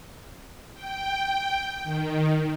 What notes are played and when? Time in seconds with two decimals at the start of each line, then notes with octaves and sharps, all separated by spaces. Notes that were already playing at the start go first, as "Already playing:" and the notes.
0.73 G5
1.84 D#3